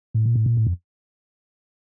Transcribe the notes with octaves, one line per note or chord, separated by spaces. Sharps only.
A2
A#2
A2
A#2
A2
F2